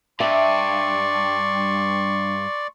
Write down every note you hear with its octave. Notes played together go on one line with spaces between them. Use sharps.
G2 D5 E5 C6 C#6